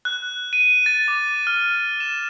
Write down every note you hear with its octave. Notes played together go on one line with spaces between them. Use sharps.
F#6
D#7
A6
D6
F6
E7